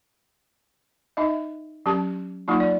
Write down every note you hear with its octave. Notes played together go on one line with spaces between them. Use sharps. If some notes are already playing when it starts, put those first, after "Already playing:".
D#4 D#5 E5
F#3 C#4 G4 A5
F#3 A#3 D#4 F4
D5